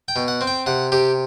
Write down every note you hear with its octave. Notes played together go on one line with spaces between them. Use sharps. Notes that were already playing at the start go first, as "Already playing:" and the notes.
G5
B2
F#5
C4
G5
C3 F#5
C3 G4